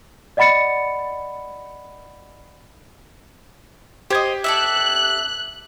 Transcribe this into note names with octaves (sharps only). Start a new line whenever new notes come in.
D5 D#5 F#5 B5 A6 C#7
G4 C5 D#5 G#6
A4 D5 E5 F#6